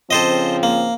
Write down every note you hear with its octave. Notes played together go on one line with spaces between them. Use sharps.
C#3 F3 C4 A4 C5 D#5
A#3